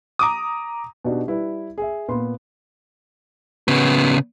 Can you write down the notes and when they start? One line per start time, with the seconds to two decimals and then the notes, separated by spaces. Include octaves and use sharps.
0.19 A#5 D6 D#6
1.05 B2 D4 D#4 F#4 G4
1.27 G3 E4 B4
1.78 G#4 E5
2.08 A#2 B3 B5 C6
3.68 C#3 B3